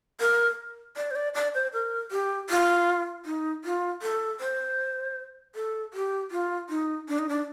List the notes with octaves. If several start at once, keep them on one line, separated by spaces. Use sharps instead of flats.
A#4
D5
C5
D5
D5
C5
A#4
G4
F4
D#4
F4
A4
C5
A4
G4
F4
D#4
D4
D#4
D4